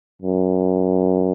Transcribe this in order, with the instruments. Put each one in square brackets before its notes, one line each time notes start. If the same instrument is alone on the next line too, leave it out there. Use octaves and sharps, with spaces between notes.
[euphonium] F#2